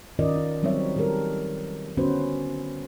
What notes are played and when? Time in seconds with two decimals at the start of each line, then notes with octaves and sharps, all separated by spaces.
0.19 D#3 C#4 F4 A#4 D5 D#5
0.36 D#4
0.63 F#3 G3 C4 D#4 C#5 E5
0.96 D#3 G3 G4 A4 A#4
1.97 D3 B3 C#4 F#4 B4 C5